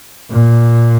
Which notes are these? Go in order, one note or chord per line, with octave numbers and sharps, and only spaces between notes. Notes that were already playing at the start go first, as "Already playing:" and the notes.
A#2